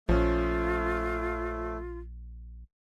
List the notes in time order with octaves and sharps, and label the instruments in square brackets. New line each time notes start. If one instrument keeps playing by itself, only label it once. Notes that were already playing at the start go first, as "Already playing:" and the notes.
[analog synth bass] A#1 [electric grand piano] F3 C#4 [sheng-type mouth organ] A3 [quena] F4